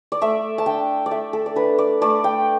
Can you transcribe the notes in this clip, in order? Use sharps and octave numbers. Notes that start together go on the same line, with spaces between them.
D5
A3 E5
A5
D4 G5
D5
A3 E5
A4
D5
D4 B4
D5
A3 D5
G5